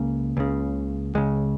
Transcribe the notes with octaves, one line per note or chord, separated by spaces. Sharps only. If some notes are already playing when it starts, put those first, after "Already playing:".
Already playing: C#2 C#3 A#3
C#2 C#3
C#2 C#3 G#3